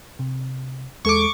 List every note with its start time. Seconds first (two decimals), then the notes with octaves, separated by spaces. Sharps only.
0.19 C3
1.05 E2 G#3 A4 C#6 D6